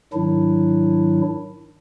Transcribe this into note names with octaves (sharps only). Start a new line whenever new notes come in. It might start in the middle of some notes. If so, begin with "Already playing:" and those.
G#2 D#3 F#3 D4 E4